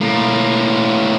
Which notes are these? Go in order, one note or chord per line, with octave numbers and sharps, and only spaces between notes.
A2 A#3